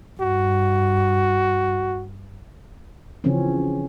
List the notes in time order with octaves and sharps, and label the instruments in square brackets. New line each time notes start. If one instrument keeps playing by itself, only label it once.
[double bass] G2 [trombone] F#4
[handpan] C#3 E3 F3 C4 C#4